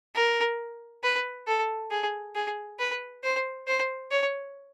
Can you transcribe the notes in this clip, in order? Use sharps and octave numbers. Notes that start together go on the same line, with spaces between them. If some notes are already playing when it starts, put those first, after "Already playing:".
A#4
B4
A4
G#4
G#4
B4
C5
C5
C#5